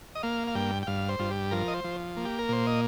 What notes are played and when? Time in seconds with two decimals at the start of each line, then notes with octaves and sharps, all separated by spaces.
0.15 D#5
0.23 A#3 F5
0.47 F5
0.55 G2 G5
0.83 G5
0.87 G2 F5
1.09 C5
1.19 G2 F4
1.31 G4
1.51 F3 A#4
1.68 D#5
1.74 C5
1.84 F3
2.17 A#3
2.25 G4
2.39 A#4
2.49 A#2 C5
2.67 D#5